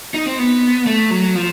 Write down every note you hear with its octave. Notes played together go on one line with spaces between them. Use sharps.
D#4
C4
B3
A3
F#3
F3